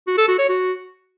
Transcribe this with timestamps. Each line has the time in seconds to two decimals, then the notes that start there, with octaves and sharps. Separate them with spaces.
0.07 F#4
0.18 A4
0.28 F#4
0.39 C#5
0.49 F#4